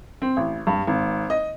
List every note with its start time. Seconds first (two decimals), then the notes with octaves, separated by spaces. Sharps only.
0.22 C4
0.37 A1
0.67 G2
0.87 G#1
1.30 D#5